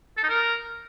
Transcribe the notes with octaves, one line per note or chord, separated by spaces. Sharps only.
A4
D#4
A#4